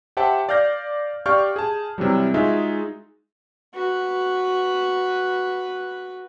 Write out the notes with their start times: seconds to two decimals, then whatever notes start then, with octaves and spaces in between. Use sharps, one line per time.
0.17 G4 C5 E5 F#5 G5 A5
0.49 D5 F5 F6 G6 A#6
1.26 G4 D5 F5 C#6 F6 G6
1.56 G#4 A5
1.98 C3 E3 F#3 G3
2.34 G#3 D#4 F4 F#4 G#4 E5
3.74 F#4 B4